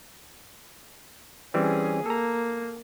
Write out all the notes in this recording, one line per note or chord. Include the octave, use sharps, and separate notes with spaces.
E3 G3 C4 C#4 G#4
A#3 A4 A#5